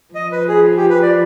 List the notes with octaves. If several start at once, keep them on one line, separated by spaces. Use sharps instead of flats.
F3 D#5
B4
G#4
G4
B4
D5